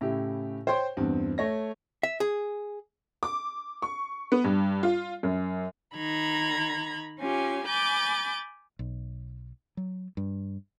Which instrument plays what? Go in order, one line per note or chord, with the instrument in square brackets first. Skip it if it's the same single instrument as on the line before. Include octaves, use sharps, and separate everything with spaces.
[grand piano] A2 C#3 E4 G4
C5 C#5 G5 C6
E2 G2 C4
A3 C#5 A#6
[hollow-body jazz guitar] E5
G#4
[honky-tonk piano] D6
C#6
B3
G2
F4
F#2
[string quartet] D#3 A#5 B5 G#6
C#4 F4 G4 G#5
G#5 B5 D6 G6 A6
[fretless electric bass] B1
F#3
G2